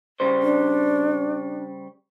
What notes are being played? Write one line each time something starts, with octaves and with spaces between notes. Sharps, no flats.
C#3 G3 C5
D4